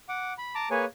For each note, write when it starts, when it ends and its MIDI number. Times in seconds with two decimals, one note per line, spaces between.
0.09 0.33 78
0.09 0.33 86
0.38 0.55 83
0.55 0.69 81
0.55 0.69 82
0.55 0.69 86
0.71 0.85 58
0.71 0.85 68
0.71 0.85 71
0.71 0.85 73
0.71 0.85 80